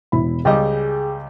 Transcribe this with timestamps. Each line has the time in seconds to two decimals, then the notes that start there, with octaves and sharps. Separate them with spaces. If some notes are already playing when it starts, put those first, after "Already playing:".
0.12 E1 E4 B5
0.45 C#2 G3 G#4 D#5 G5 D6